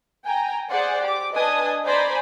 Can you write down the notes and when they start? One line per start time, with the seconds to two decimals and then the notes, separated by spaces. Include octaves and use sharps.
0.24 G5 G#5 A#5
0.69 G#4 C5 D5 F#5
1.02 G4 D6
1.34 D4 B4 D#5 G#5 A5 D#6
1.85 C5 D5 G#5 A#5 B5